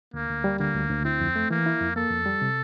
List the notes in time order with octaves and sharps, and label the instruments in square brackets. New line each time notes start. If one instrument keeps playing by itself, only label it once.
[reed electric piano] D2 [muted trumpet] A#3
[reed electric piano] D2
G3
[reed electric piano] D3 [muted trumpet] A#3
[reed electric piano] D2
D2
[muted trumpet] C4 [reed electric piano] E4
[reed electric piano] F2
A3
[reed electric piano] E3 [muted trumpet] A#3
[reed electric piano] E4
F2
[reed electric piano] A#3 [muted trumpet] A4
[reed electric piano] F2
G3
C3